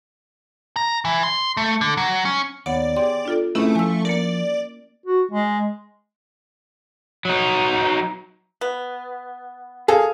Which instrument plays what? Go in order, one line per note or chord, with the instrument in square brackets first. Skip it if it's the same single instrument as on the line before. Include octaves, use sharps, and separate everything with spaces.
[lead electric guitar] A#5
E3
C6
A3
D3
F#3
C#4
[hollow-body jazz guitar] D#2 [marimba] B3 C#5 F#5 [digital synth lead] D5
[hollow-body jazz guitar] G4 G#4 [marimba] C6
[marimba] D4 F4 A4
[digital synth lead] A3 [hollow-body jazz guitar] C4 G#4 B4 [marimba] C#4 E4 E5
[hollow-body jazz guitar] F3 [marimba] G#5 E6
[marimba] A#3 A#4 [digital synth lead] D5
[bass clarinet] F#4
G#3
[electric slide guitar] F#3 D#4
[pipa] B3
[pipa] A#3 A4 F5 [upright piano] G#4